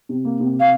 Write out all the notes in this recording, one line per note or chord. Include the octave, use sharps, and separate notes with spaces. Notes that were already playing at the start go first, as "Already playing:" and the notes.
C3
A#3
C3
F5